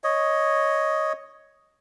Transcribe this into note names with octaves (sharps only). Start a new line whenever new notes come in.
C#5 D#5